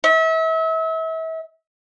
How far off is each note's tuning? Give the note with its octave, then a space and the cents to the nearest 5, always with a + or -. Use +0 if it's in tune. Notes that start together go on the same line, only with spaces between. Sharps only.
E5 -35